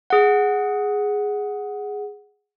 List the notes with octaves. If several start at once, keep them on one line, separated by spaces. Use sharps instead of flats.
G#4 F#5